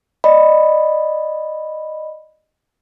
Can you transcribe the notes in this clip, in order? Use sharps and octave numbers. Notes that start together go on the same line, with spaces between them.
D5 D#5 B5